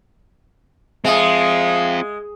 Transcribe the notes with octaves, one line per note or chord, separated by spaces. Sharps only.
G#3 C4 F4 E5 F5 D#6